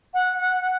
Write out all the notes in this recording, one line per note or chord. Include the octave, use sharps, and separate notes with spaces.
F#5